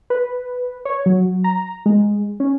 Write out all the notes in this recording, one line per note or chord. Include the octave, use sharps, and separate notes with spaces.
B4
C#5
F#3
A#5
G#3
C#4